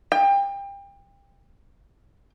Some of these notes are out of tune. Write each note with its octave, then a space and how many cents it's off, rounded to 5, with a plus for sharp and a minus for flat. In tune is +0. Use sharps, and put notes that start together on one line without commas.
G5 +30